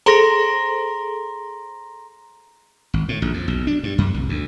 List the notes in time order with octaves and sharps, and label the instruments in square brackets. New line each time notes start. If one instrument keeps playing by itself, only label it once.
[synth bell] G#4 A4 C5 [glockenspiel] A#5 C6 A#6
[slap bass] G#1
A2
A#1
F2
B1
D4
G2
F#2
C2
D2